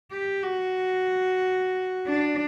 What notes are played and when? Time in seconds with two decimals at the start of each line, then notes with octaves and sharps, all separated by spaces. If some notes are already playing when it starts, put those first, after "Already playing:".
0.12 G4
0.44 F#4
2.06 D4